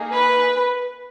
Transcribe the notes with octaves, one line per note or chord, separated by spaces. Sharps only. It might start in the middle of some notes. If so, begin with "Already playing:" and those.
Already playing: A#3 D#4 G#4
B4